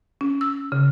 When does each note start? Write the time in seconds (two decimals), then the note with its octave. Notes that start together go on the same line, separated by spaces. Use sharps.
0.21 C#4
0.41 E6
0.72 C#3